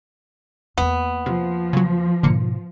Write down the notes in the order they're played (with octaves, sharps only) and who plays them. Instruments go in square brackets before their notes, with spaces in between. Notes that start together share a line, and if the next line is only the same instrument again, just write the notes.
[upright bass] E2 A#3 [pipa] B3
[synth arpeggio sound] C3 [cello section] F3
[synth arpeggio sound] C#3 F#3
[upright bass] G#2 B2 [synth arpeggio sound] D3 A#3 C#7